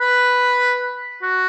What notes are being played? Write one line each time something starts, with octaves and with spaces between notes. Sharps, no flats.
B4
F#4